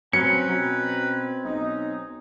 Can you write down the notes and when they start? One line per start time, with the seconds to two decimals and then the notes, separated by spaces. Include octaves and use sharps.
0.13 F#3 C4 C#4 B4 G5 A#5 C#7
0.50 B2
1.44 B1 D#4